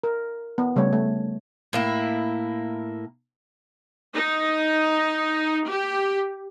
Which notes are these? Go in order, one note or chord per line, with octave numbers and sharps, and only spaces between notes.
A#4
B3
C#3 G3 A3 C#5
A3
A2 A#3 E4
D#4
G4